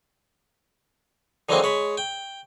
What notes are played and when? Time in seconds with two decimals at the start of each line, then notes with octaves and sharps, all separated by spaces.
1.49 D3 E3 F#3 G#3 A#3 C4
1.63 G#3 C#5 B5
1.98 G5